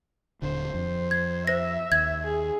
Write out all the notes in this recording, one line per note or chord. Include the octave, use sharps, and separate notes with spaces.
D#1 D3 C5
F2
G#6
C5 E5 A#6
D#2 G#6
G#4